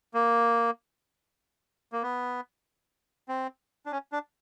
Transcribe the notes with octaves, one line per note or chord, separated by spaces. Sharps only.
A#3
A#3
B3
C4
D4
C#4
D4